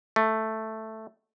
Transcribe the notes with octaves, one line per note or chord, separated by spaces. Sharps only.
A3